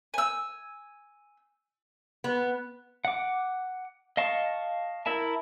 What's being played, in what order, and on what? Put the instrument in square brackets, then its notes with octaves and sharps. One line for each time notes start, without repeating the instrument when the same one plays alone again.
[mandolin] G#5 E6
[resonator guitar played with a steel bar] B3
[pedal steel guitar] F#5 D6
D#5 F5 A5 C#6
E4 A#4 E5 A5